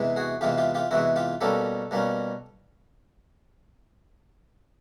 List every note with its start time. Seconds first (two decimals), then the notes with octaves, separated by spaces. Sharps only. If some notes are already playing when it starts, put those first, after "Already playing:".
Already playing: E2 C3 E3 G#3
0.16 F#4 G#4
0.41 E2 C3 E3 G#3 F4 G4
0.58 F4 G4
0.75 F4 G4
0.91 E2 C3 E3 G#3 E4 F#4
1.16 F4 G4
1.41 B2 G3 A#3 C#4 G4 A4
1.91 B2 G3 A#3 C#4